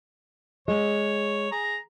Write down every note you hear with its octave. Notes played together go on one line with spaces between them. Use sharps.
G#3 C#5
G#4 A#5